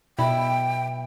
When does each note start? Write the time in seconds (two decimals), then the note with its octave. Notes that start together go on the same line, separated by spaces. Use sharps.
0.19 B2 E4 G5